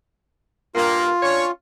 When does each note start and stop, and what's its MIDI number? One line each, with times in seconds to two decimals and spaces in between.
0.75 1.09 43
0.75 1.09 58
0.75 1.51 65
1.23 1.47 61
1.23 1.47 62
1.23 1.47 73